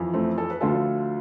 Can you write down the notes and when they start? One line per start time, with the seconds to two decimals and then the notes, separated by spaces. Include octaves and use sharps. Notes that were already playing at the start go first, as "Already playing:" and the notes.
Already playing: F2 E3
0.13 A3 C4
0.38 A4
0.50 B4
0.61 D2 D3 F3 F4 A4